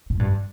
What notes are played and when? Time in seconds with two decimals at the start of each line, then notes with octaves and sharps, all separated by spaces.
0.10 A#2
0.19 G2